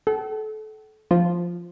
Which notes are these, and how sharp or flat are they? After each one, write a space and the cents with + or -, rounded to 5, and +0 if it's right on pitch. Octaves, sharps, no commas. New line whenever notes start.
A4 -30 F#5 +45
F3 +0 F4 +0